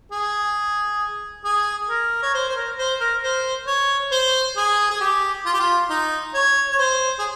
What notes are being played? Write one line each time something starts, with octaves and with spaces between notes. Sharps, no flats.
G#4
G#4
A#4
C#5
C5
C5
A#4
C5
A#4
C5
C#5
C5
G#4
G#4
G4
F4
G4
F4
D#4
C#5
C#5
C5
G#4